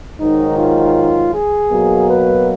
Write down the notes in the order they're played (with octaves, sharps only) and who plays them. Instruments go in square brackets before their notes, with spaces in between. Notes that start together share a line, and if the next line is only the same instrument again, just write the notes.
[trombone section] G#2 D#3 F#3 D#4
F4
G#4
B2 F#3 A#3
B4